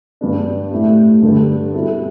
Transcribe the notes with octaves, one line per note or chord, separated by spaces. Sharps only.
G2 G3 B3 D4
A2 A3 E4 G4
G2 D3 G3 D4 A4
B2 G3 E4 A4